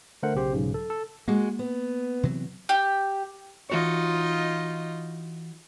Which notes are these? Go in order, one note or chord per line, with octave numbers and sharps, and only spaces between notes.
D3 A3 A#4 C5 F#5
B1 C#3 G4 C5
B1 G#2 C#3
A4
A4
G#3 A#3 F#4
B3
C3 E3 F#3
G4
E3 D#4 F4 F#4 C#5 D#5